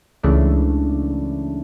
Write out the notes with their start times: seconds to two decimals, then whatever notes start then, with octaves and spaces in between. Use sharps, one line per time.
0.23 C#2 C#3 E3 A3 D4